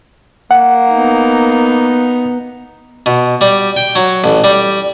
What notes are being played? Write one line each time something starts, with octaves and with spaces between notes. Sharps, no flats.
A#3 F#5
B3 D#4
B2
G3
G5
F#3
A1
G3